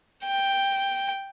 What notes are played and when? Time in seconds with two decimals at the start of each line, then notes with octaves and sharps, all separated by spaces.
0.24 G5